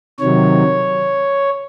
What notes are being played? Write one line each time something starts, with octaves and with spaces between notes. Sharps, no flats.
C3 D#3 F#3 C#5